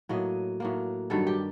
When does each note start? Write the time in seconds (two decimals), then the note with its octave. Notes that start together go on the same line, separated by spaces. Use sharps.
0.09 A2 F#3 A#3 D#5
0.60 A2 F#3 A#3
1.10 G2 D#3 F#3 A4
1.27 G4